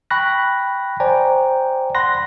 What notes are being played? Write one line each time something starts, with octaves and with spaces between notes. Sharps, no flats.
G5 B5 C#6 F#6 A#6
C5 D5 G5 G#5 A#5
F#5 B5 C6 F#6 A#6